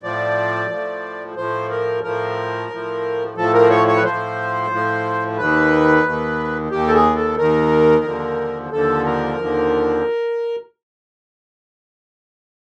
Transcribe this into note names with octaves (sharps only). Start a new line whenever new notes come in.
A2 F3 D5
A2 F3
A2 F3 C5
A#4
A2 F3 A#4
A2 F3
A2 F3 A4
A#4
C#5
C#5
B4
A2 F3 C5
A2 F3
D#2 D#3 B4
D#2 D#3
D#2 D#3 G4
A4
G#4
A4
D#2 D#3 A#4
D#2 D3 F3
D#2 D3 F3 A4
A#4
D#2 D3 F3